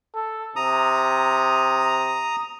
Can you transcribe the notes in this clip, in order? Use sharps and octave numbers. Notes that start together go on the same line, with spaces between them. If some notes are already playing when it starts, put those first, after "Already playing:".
A4
C3 A#5 D#6